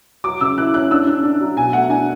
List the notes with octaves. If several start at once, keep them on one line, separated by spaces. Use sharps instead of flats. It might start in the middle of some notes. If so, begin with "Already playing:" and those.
F#3 D6
C#3 E6
E4 F#6
C#4 F#6
D4 E6
D4
D4
F#3
B2 G#5
A3 F#5
D4 G#5